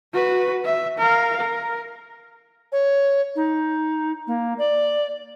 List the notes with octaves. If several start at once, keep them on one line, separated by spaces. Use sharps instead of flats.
F#4 B4
E5
A#4 F5
A#4
C#5
D#4
A#3
D5